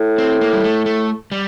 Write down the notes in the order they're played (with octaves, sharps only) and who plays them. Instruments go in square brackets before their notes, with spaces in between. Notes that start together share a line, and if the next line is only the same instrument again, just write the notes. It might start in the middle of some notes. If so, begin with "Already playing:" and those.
Already playing: [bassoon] A2
[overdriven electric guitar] C4
A#3
G3
A3
A3
G3